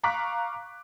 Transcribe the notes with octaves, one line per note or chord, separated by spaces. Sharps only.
F5 A#5 C#6 D6 F#6 B6